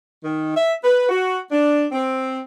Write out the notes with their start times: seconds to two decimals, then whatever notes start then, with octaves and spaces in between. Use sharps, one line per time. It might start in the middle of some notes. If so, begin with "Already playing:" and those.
0.24 D#3
0.55 E5
0.84 B4
1.09 F#4
1.51 D4
1.92 C4